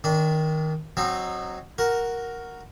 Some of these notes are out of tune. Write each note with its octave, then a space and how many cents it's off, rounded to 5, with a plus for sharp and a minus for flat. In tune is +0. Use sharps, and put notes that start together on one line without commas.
D#3 +10 D4 -30
F#3 +0 C4 +15 D#4 -25
F#4 +0 A#4 +0